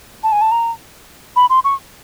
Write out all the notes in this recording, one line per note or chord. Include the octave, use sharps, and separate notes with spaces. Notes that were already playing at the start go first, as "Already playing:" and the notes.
A5
G#5
A5
A#5
B5
C6
C#6